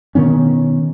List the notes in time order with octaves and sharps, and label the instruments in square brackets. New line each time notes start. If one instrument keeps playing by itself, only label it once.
[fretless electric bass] B2 D#3 B3 C#4